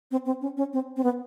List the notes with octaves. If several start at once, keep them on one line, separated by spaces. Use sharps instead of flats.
C4
C4
C#4
C#4
C4
C4
B3